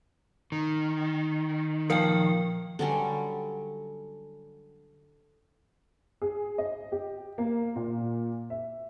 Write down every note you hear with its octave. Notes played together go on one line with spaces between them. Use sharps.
D#3
A#2 F3 A#4 F5 G5
D3 F#3 G3 C#4
G#4
D#5
G4
A#3
A#2
E5